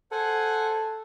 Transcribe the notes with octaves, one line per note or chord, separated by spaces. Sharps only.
A4 C5 F#5 G#5